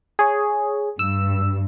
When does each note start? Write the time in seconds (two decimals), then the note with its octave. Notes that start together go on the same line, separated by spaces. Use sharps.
0.19 G#4 C#5
0.99 G2 E6